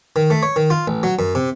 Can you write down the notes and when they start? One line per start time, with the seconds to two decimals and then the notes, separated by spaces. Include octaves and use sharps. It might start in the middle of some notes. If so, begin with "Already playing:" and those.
0.16 D#3
0.30 A3
0.43 C#5
0.56 D#3
0.70 F4
0.88 A1
1.03 F#3
1.19 F#2
1.35 C3